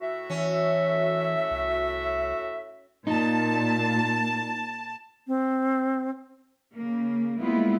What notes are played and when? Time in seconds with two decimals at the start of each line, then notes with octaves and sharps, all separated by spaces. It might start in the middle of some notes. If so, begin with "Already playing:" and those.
0.01 A2 F#4 E5
0.30 E3 C#4
1.51 C2
3.07 A#2 D#4 A5
5.27 C4
6.74 C#3 A#3
7.40 G3 G#3 A#3 B3 E4 F4